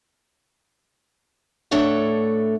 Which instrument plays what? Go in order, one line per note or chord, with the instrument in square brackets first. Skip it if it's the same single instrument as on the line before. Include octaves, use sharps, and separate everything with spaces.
[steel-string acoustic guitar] A2 A3 D4 A4 C#5 F#5